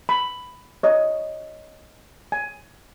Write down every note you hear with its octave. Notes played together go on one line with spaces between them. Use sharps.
B5
C#5 D#5
G#5